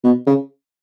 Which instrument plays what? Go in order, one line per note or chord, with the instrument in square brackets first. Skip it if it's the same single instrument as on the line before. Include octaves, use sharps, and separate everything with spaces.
[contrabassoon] B2
C#3